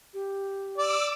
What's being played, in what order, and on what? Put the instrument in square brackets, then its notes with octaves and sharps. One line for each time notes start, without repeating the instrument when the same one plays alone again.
[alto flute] G4
[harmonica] D5 [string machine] D6 E6